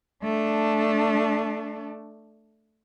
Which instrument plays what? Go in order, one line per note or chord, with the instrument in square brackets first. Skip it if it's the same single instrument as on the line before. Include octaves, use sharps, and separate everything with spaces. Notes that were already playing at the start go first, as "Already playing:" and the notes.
[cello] A3 D4